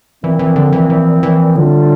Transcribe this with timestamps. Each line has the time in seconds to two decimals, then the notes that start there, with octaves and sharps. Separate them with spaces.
0.23 A#2 E3 F3 C4
0.39 E3
0.56 D3
0.73 E3
0.90 E3
1.23 E3
1.55 A2 D3 G3 D4 F4